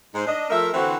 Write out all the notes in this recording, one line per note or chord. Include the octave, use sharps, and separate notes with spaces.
G#2 D#4 C5
D4 D#5
F3 A3 A#4 E5
D3 E3 C4 F#4 A4 C5